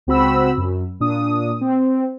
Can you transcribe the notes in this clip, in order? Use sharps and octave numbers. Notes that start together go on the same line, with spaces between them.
C#2 C4 F#4 B5 E6
F#2
A#2 D4 D#6
C4